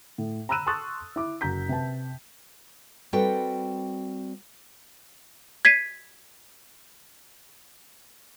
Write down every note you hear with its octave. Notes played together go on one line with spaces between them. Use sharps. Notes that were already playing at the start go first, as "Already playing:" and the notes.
A2
A#5 B5 E6 F#6 D#7 E7
A5 C6 C#6 D#6 F#6 A6
E4 D6
F#1 F#4 A#5 G6 B6
C3 B4 A5
G3 C4 F#4 A4 B4 G5
G#6 B6 C7 D#7